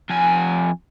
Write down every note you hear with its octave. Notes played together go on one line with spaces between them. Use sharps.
F2 G#5